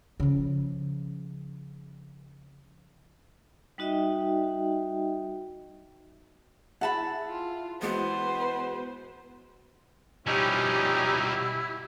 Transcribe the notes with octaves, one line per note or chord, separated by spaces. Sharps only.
C#3 F3
G3 D#4 F#4 D#5 E5 G5
E4 G#4 E5 F#5 A5 B5
F4
E3 G#3 B3 F#4 B4 C5
B2 F3 G3 C#4 D#4 E4 G4